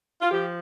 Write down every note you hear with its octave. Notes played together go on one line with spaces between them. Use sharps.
F4
F3 G4